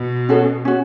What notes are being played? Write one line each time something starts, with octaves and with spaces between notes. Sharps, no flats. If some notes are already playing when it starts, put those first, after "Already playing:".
Already playing: B2
C#4 F#4 A4
C#4 F#4